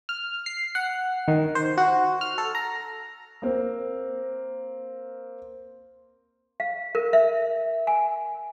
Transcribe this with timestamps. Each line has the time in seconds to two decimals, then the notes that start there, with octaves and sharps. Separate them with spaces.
0.09 F6
0.46 C7
0.75 F#5
1.28 D#3
1.55 C5
1.78 F#4
2.21 F6
2.38 A4
2.55 A#5
3.42 A#3 C4 A#4
6.60 F5
6.95 A#4
7.13 E5
7.87 G#5